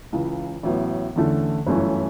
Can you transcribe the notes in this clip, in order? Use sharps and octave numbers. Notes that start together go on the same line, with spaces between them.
C#2 C#3 E3
A1 A2 F#3 B3
E2 D3 A3 C#4
G1 F#2 E3 A3 C#4